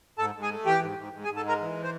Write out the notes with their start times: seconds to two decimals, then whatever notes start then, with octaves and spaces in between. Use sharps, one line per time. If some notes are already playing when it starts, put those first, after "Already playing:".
0.18 G#2 A4 A5
0.35 G#2
0.42 G#4 G#5
0.50 A3
0.66 E3 G4 G5
0.81 G#2
0.98 G#2
1.13 G#2
1.24 G#4 G#5
1.29 G#2
1.36 A4 A5
1.44 G#3 A#4 A#5
1.61 E3
1.83 C5